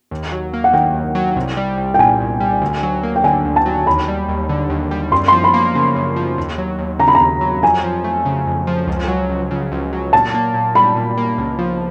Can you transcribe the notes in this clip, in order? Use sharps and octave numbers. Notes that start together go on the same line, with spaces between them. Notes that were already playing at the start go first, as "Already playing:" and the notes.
D#2
F#3
A#3
F#5
D#3 G5
D#2
F#3
C2
G3
C2
G5
A#2 G#5
C2
G3
D2
F#3
A#3
G5
D3 G#5
D2
A5
F#3
D#2 B5
G3
D#2
D3
D#2
G3
F#2 C6
F3 C6
B5
A#3
C#3
F#2
F3
D#2
F#3
D#2
C#3 A#5
B5
A#5
D#2
F#3
F2 G#5
F3
A3
C#3
F2
F3
C#2
F#3
C#2
C#3
C#2
F#3
A#2 A5
A#3
A#2
G3 B5
A#2
A#3
C#2
F3